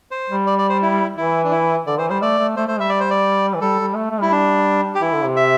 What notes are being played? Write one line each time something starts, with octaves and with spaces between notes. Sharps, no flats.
C5
G3
D5
D5
C5
E4
E3 E4
D4
E4
D3 D5
E3 C5
G3 C5
A3 D5
A3
A3 C5
A3 C5
G3 E5
D5
C5
D5
E3
G3 A4
G3
A3
A3
G3 E4
D4
G4
E3 E4
D3
C3
E5